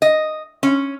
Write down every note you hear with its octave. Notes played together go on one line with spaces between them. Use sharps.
D#5
C#4